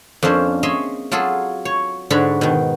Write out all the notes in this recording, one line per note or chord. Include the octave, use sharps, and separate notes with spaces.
F2 A#3 C#4 D4 C5
G#4 C#5 D#5 E5 C6
F#3 F4 G#4 A4
C#5
G#2 D3 D4 F#4 C#5 B5
B2 D#3